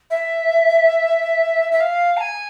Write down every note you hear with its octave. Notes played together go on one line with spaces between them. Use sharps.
E5
E5
F5
A#5
G#5